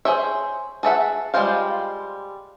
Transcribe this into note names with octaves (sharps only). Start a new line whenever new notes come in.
G#4 C5 C#5 E5
G#4 A4 E5 F#5
G3 G#3 F4 C5 F5